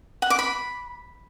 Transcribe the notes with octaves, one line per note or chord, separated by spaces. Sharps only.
F#5
D6
B5